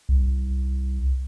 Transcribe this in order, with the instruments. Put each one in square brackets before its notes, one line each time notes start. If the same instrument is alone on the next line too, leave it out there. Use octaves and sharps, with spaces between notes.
[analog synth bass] C2